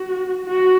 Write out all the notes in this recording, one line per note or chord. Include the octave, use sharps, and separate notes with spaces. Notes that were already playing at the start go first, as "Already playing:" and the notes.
Already playing: F#4
F#4